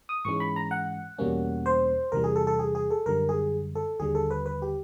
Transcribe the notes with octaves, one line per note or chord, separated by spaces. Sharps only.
D#6
G#2 E3 G#3 C#4 C#6
B5
A#5
F#5
E2 B2 G3 A#3 C#4
C5
E2 C3 E3 G3 A#4
G#4
A4
A4
G#4
G#4
A4
F#2 D3 G3 A#4
G#4
A4
D#2 D3 G3 G#4
A4
B4
B4
G4